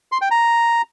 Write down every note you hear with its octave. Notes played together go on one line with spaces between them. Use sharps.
C6
G5
A#5